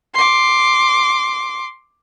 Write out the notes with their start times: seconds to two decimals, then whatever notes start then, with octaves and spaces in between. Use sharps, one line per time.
0.14 C6 D6